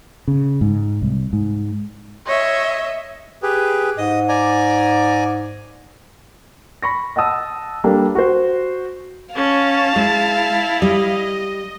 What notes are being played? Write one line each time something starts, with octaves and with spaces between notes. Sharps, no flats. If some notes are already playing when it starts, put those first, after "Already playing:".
C#3
G#2
C2
G#2
C#5 D#5 E5
G4 G#4 B4
G#2 D#5 D#6
D5 G#5 A#5
B5 C#6 A#6
D#5 F#5 A5 D#6 E6
G3 A#3 D4 G4 A4
F#4 C5
C#4 F5 A5
G#3 E4
G3 D#5